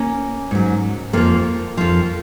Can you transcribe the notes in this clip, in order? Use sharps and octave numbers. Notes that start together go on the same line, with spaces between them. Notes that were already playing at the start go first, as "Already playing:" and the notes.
Already playing: A#3 C#4
G#2 F#3
F2 F3 A#3
F2 F3